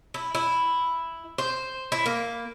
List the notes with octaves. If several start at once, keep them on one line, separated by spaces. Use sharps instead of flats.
E4
E4
C5
E4
A#3